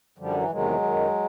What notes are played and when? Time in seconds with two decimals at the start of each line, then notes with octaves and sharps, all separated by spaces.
0.18 F#2 D3 F3 G3
0.34 E3 F#3
0.50 E2 C3 D#3 F#3 G#3
0.82 F#2 D#3